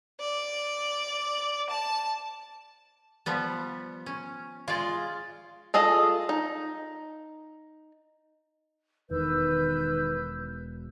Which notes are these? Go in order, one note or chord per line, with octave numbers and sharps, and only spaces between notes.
D5
A5
F3 G3 B3
C#4
G#3 F4 D5
F4 G#4 A4 D#5
D#4
E1 D#3 B4 E6 G6